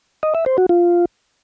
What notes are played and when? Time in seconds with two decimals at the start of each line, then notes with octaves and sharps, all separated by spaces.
0.23 D#5
0.35 E5
0.46 C5
0.58 F#4
0.69 F4